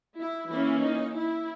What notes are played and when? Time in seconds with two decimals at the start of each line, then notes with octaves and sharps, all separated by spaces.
0.17 E4
0.49 E3 A#3 C#4 E4
0.82 D#4
1.15 E4